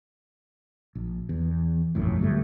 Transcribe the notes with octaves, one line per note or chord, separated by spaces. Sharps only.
A#1
E2
E1 A#1 F#2 A2
D2 G2 E3 A3